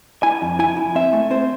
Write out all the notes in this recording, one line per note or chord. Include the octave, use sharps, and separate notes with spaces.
E4 G#5
F2
E4 G#5
E4
C4 E5
A3
C4 C5